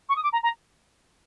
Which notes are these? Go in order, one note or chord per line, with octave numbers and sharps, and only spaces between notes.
C#6
D#6
D6
A#5
A#5